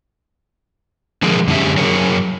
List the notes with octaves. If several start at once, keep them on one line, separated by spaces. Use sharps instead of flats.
D3 F3 G#3 G#4 A#4
F#2 D3 G#3 C#4 G4 E5
F#3 G#4 A#4 C#5